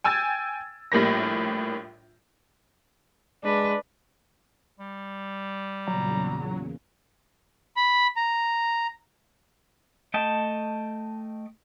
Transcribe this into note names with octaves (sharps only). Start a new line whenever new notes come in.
G5 G#5 E6 G#6 A6
A#1 A2 G3 A#3 A#6
G#3 D4 B4
G3
E2 A#2 C#3 F#3 A#5
B5
A#5
A3 D#5 G5 A5